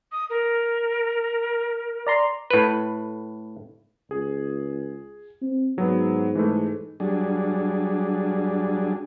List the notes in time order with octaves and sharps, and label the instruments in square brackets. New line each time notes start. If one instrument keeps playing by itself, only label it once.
[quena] D#6
A#4
[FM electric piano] D5 A#5 C6
[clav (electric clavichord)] A2 B4
[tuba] C#2 [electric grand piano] G#4
[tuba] C4
[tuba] G#2 [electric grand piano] F#3 B3
[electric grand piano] E3 G#3 A3
[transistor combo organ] F#3 G3 D4 G#4